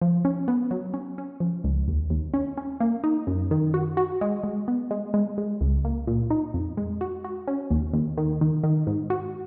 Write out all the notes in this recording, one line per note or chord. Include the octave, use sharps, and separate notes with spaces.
F3
C#4
B3
F#3
C#4
C#4
F3
C#2
D#2
D#2
C#4
C#4
A#3
D#4
F#2
D#3
F#4
F#4
G#3
G#3
B3
G#3
G#3
G#3
C#2
A#3
A#2
D#4
F2
G#3
F#4
F#4
C#4
D#2
D#2
D#3
D#3
D#3
G#2
F#4